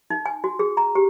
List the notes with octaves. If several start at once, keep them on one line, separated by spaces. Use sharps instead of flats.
D#4
G#5
F#4
G#4
A#5
G4